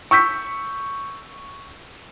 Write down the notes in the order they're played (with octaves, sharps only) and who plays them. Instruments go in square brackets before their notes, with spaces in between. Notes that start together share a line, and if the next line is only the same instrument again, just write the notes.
[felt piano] C#6 E6 G6 B6